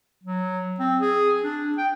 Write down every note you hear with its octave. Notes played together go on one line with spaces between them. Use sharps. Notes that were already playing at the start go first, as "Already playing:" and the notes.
F#3
C4
G#4
D4
G5